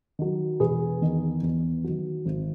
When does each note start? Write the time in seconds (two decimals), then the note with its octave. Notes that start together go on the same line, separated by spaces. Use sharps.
0.19 D#3 F#3
0.60 E1 G#4 B4
1.01 E2 D#3
1.43 E2
1.84 D#3 F#3
2.25 G#1